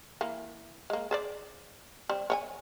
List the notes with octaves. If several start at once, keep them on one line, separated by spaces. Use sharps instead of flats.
E3 A#3
G#3 A#3
G#4 C5 D5
G3 C4
C#5 D#5 G#5